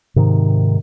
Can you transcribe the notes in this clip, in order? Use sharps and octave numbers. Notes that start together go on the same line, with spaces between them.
G#2 C3 D#3